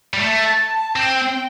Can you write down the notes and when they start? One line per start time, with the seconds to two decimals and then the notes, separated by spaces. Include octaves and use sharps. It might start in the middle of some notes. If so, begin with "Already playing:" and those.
0.14 G3
0.20 A3 A5
0.58 A5
0.96 C4 G5